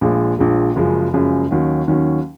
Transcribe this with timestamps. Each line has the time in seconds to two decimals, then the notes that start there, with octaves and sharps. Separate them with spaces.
0.01 A#1 A#2 F3 G#3
0.39 A#1 A#2 F3 G#3
0.76 F#1 F#2 C#3 F3 G#3
1.13 F#1 F#2 C#3 F3 G#3
1.51 D#2 D#3 F#3 C#4
1.88 D#2 D#3 F#3 C#4